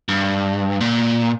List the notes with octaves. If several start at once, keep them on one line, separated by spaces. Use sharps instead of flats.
G2
A#2